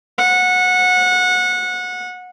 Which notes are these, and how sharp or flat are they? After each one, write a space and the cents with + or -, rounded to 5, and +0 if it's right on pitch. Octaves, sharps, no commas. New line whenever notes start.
F#5 -20